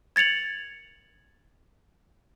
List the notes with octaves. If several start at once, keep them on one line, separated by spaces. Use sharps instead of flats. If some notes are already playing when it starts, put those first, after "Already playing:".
G#6 A6 C#7 F7 F#7